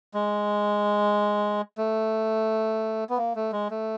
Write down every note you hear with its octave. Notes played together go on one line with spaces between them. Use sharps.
G#3
A3
B3
A#3
A3
G#3
A3